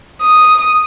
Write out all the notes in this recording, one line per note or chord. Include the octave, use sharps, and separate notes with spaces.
D#6